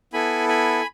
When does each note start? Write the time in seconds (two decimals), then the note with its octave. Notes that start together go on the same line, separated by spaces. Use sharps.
0.13 B3 E4 A4 G#5 B5
0.48 G#5 B5